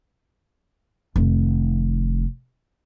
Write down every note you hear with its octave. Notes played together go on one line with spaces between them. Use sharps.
F1 D#3